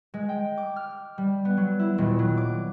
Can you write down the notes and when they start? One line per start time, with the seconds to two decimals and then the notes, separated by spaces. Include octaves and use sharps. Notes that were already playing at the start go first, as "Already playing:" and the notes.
0.14 G#3
0.29 G5
0.57 D6
0.76 F6
1.18 G3
1.45 B3
1.57 F#3
1.79 E4
1.98 D#1
2.19 F#3
2.37 D6